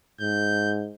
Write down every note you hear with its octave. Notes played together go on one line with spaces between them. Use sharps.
G#2 G6